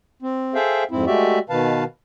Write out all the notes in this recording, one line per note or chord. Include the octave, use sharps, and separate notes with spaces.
C4
G#4 A4 C5 E5 F5 G5
F2 G#2 C4 E4
G#3 A3 F#4 G4 D5 E5
B2 D#3 B4 F5 A5